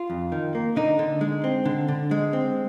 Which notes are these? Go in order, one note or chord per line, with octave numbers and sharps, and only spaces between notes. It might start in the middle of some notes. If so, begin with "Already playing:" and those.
Already playing: F4
F2
D#3
A#3
D3 D#4
D3
G#3
C4
D3
D3
G#3
C4